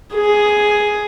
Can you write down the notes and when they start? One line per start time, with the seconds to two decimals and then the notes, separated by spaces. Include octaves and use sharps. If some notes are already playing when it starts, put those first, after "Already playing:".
0.15 G#4